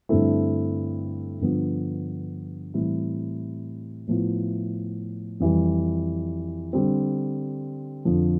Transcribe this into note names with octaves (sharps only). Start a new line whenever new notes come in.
G2 D3 A3 C4 E4
G2 D3 F3 B3
A2 E3 G3 C4 E4
A2 F3 B3 E4
F2 E3 G3
D3 G3 C4
F2 D3 F3